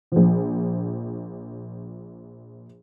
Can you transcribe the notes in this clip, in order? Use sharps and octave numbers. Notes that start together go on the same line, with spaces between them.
A#1 F3